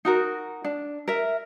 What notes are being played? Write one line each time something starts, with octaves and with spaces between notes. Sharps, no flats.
D#4 F#4 A#4
D4
A#4 E5